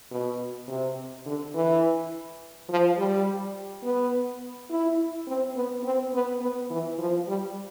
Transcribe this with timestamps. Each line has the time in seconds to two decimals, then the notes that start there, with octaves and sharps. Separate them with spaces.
0.11 B2
0.68 C3
1.26 D3
1.54 E3
2.69 F3
2.97 G3
3.83 B3
4.70 E4
5.27 C4
5.56 B3
5.83 C4
6.13 B3
6.42 B3
6.70 E3
6.98 F3
7.28 G3